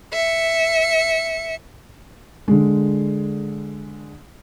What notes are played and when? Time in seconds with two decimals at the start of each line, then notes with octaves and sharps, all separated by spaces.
0.13 E5 C#7
2.48 D3 G#3